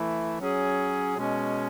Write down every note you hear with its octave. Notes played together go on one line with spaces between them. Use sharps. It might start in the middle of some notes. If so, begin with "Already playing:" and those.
Already playing: E3 A3 E4
F#3 C#4 G#4
B2 G#3 C#4